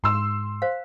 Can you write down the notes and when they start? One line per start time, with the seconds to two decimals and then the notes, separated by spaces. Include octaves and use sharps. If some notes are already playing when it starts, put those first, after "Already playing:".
0.04 G#2 C6 E6
0.62 C5 F5